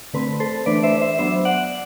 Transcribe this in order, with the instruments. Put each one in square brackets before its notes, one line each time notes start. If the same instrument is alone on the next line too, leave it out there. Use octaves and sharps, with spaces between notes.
[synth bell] D3 A3 C4 B4
A4 C5
E3 A3 D4 B4 D5
C5 E5
C5 E5
F#3 B3 D4 C5 E5
D5 F#5